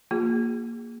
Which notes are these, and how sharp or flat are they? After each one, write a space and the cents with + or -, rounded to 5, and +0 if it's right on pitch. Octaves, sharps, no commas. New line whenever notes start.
A#3 +0 F4 +40 G#4 -15